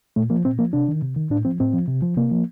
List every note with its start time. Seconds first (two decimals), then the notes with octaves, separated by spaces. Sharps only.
0.16 A#2 A3
0.30 F3 A#3
0.45 A#2 C4
0.59 F3 A#3
0.73 C3 D4
0.89 D#3
1.02 C3
1.16 D#3
1.30 A2 D4
1.45 F3 C4
1.60 A2 C4
1.73 F3
1.88 C3
2.02 F3
2.17 C3 A#3
2.31 F3